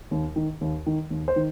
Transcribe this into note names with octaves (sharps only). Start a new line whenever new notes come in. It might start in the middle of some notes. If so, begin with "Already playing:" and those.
D#2
D#3
D#2
D#3
D#2
C5
D#3